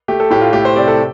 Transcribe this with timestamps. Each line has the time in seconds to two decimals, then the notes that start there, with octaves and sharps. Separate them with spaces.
0.08 A3 G4
0.20 A4
0.30 A2 G4
0.42 F4
0.53 A3 G4
0.65 C5
0.76 C3 D5
0.88 A4